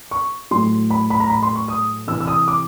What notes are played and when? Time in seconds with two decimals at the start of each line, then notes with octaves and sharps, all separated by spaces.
0.11 C#6
0.51 A2 F#3 C6
0.90 B5
1.10 B5
1.20 A#5
1.30 B5
1.43 C6
1.56 C#6
1.68 D#6
2.08 C3 E3 E6
2.21 E6
2.27 D#6
2.48 D6